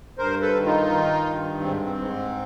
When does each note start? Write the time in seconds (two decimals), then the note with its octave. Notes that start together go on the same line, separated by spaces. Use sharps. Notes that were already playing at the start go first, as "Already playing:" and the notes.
0.17 G2 A#4 C5
0.42 A4 B4
0.54 D#3
0.65 D#4 F4
0.89 D#3
1.24 G2
1.60 G#2 C4
1.84 C4
1.96 G#2